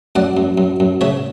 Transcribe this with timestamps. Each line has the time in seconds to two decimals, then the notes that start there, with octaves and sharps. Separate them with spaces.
0.15 F#2 D5 F#5
0.37 F#2
0.58 F#2
0.80 F#2
1.01 C#3 C#5 E5